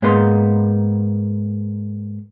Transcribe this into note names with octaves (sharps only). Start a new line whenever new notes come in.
G#2 A#3 B3 D#4 C6